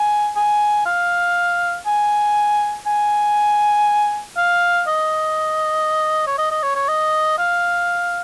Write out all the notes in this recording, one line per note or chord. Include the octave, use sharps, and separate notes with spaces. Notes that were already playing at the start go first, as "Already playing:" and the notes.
Already playing: G#5
G#5
F5
G#5
G#5
F5
D#5
C#5
D#5
D#5
C#5
C#5
D#5
F5